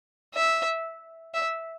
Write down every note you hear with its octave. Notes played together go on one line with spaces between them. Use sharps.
E5
E5